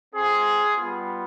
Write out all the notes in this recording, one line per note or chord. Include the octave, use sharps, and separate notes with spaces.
C4 F4 G#4
G3 B3 F4